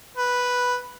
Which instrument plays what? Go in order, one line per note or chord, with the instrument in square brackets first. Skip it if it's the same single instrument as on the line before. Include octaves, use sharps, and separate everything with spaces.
[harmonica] B4